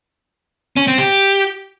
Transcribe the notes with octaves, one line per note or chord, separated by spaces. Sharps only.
C#4
C4
G4